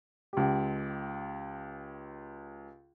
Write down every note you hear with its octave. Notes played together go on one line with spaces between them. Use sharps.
C#2 G4